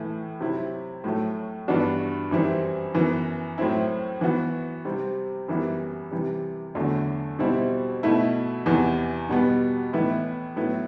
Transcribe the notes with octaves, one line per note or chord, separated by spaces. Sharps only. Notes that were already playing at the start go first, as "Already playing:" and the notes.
Already playing: A2 E3 A3 E4
C3 F#3 C4 E4
A2 F#3 A3
G2 E3 B3 D4 F#4
F#2 E3 G3 C4 E4
F#2 E3 B3
A2 F#3 C4 E4
E3 B3 F#4
C3 G3 C4
F#2 E3 G3 B3 E4
C3 E3 G3
E2 D3 F#3 A3
B2 G3 C4 E4
B2 A3 E4
E2 C3 E3
B2 G3 B3
A2 E3 B3 E4
A2 F#3 B3 E4